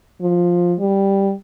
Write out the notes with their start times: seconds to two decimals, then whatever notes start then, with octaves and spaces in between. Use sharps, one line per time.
0.21 F3
0.80 G3